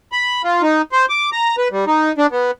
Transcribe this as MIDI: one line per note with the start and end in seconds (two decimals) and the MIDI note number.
0.12 0.42 83
0.44 0.62 65
0.62 0.82 63
0.92 1.06 72
1.09 1.30 86
1.32 1.56 82
1.58 1.68 71
1.71 1.85 55
1.87 2.12 63
2.18 2.27 62
2.32 2.51 59